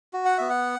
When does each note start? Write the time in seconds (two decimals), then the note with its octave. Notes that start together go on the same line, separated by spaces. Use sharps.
0.13 F#4
0.25 F#5
0.38 B3 E5
0.50 F#5